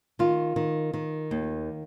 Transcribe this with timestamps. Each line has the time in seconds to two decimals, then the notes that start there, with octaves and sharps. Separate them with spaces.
0.19 D#3 F4
0.56 D#3
0.94 D#3
1.31 D#2